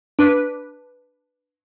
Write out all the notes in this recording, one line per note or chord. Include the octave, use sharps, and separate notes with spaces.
D4 B4